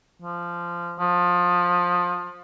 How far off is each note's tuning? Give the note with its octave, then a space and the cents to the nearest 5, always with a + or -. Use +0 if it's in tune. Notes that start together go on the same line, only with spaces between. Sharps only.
F3 -15
F3 +20